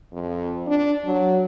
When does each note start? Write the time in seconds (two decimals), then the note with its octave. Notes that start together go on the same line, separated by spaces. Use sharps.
0.13 F2
0.67 D4
1.05 F#3